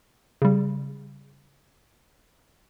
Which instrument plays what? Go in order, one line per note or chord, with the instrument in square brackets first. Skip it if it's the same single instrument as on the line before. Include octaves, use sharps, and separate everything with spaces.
[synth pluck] C#3 G3